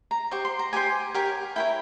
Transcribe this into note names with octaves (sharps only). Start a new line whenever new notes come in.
A#5
G4 C5 C#6
C6
A#5
G4 C5 G#5
G4 A#4 C#5
E4 A#4 C#5 G5